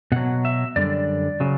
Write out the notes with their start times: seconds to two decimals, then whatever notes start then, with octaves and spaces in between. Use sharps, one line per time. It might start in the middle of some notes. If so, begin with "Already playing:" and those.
0.12 B2 F#3 F#5
0.45 E5
0.76 F#2 D3 G3 D5
1.40 C#3 F#3